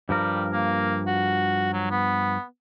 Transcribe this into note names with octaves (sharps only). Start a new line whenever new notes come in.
G2 F3 G3 A#4
A#3
F#4
F#3
B3